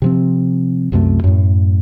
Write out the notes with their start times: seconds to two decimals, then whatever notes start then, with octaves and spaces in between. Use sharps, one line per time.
0.02 C3 F3 C4
0.92 C2 F#2 C3 A3
1.24 F#2 A2